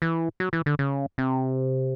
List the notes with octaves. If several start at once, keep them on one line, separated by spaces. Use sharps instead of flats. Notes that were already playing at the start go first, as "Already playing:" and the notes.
E3
F#3
E3
D3
C#3
C3